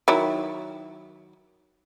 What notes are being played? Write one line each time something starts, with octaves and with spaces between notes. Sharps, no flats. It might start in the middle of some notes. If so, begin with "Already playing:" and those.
D#3 F#3 E4